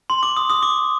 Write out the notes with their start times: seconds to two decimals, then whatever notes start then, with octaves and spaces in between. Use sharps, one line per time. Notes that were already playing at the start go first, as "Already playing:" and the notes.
0.10 C6
0.23 D6
0.37 D#6
0.50 D#6
0.63 D6